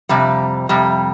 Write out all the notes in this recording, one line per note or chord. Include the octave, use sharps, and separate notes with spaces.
F2 C3 G3
F2 C3 G3